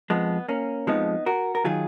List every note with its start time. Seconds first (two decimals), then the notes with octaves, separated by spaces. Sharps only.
0.10 F2 F3 G#3 B3
0.48 A#3 C#4
0.87 F2 F3 G#3 B3 D#4
1.26 F#4 A#4
1.55 A#4
1.64 D#3 F#3 F4 G#4